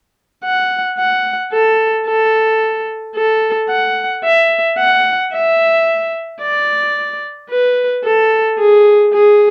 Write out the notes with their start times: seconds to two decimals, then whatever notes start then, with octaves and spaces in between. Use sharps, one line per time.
0.44 F#5
0.99 F#5
1.52 A4
2.07 A4
3.16 A4
3.70 F#5
4.24 E5
4.79 F#5
5.33 E5
6.42 D5
7.50 B4
8.04 A4
8.59 G#4
9.13 G#4